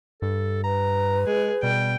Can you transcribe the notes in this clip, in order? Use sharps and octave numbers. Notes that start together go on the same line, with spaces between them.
G2 A4
B4 A#5
G#3 G#4
B2 G3 G5